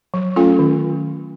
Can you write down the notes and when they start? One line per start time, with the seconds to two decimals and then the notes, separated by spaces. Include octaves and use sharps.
0.14 F#3
0.36 A3 C#4 F4 A4
0.59 D#3